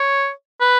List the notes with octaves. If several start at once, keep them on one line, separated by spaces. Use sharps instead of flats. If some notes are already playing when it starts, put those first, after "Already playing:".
Already playing: C#5
B4